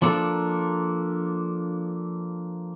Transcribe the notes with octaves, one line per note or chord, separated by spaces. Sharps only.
F3 A#3 D4 A4